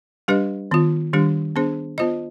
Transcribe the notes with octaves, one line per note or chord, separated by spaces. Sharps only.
G3 D4 G4 B4 D#5
D#3 B3 F4
D#3 G3 D4 G4
B3 D4 G#4 C5
B3 F4 C5 D#5